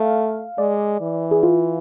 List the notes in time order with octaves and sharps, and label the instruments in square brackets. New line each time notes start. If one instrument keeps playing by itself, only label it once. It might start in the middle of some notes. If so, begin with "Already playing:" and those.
Already playing: [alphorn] A3 [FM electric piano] F5
[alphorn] G#3 [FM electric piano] D5
[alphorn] E3
[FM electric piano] G#4
F4